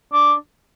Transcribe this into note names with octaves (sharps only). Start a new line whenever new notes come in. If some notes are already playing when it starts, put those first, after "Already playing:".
D4